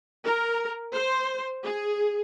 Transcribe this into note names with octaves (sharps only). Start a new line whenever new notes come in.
A#4
C5
G#4